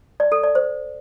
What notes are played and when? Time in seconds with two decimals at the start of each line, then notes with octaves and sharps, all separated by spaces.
0.20 D5
0.32 A4
0.43 D5
0.55 C5